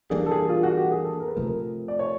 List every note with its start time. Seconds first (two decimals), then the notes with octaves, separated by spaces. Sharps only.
0.10 E3 G3 A#3 D4 G#4
0.26 A4
0.32 G#4
0.49 F4
0.63 F#4
0.77 G4
0.92 G#4
1.05 A4
1.20 A#4
1.28 B4
1.36 C3 F3 A3 A#4
1.88 D5
1.99 C#5